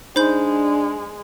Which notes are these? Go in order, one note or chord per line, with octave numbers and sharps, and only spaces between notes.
G#3 D4 D#4 C5 B5 G6